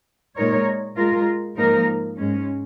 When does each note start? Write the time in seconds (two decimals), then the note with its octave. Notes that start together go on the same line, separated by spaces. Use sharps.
0.36 A#2 G#3 D#4 A#4 C#5
0.96 G#3 F4 A#4
1.57 G#2 F3 A#3 D#4 A#4
2.17 G#2 G#3 C#4